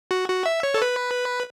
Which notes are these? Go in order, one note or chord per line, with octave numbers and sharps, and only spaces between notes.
F#4
F#4
E5
C#5
A4
B4